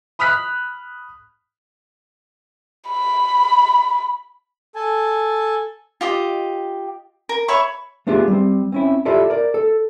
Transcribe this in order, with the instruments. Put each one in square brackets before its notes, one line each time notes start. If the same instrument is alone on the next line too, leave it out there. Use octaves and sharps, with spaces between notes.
[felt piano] B5 D#6 F6 F#6 B6
[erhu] B5
[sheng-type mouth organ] A4 G#5 A5
[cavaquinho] F4 G4 D#5
A#4
C#5 E5 B5 C#6
[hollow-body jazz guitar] A3 B3 D4 F4 G4 G#4
G3 C4
C4 C#4 E4
E4 F4 G4 A4 D5 E5
A#4 D5
A4